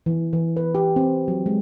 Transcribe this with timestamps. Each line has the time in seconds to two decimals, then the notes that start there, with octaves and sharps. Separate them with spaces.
0.06 E3
0.33 E3
0.56 B4
0.75 G4
0.96 C4
1.28 F#3
1.46 G#3